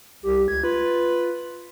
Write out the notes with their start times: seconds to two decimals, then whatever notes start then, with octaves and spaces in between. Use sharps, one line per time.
0.23 C2 G4
0.48 C#2 G#6
0.64 F4 B4